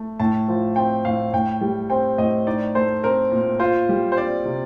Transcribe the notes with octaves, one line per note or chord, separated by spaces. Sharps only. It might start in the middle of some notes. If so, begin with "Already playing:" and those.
Already playing: A3
A2 A5
F3
C4 G5
A2 F5
A2 G5
G3
C4 G5
A2 D#5
D#4 D5
A3 C5
C4 A#4
A#2
F4 C5
G3
C5
C4 D5
C3